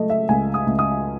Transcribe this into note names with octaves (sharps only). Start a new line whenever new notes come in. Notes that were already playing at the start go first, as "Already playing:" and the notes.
Already playing: C#2 F#3 A3 D#5
E5
C#2 G#5
D#6
C#2
D#6